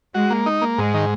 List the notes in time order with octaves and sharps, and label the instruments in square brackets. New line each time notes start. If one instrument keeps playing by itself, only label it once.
[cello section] G#3 [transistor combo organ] F#4
[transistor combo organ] A#3
D#4
A#3
[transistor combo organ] G#2 [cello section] G#3
[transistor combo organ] D#3